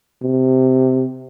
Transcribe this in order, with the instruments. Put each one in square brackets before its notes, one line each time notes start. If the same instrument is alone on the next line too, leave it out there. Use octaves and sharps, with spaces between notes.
[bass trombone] C3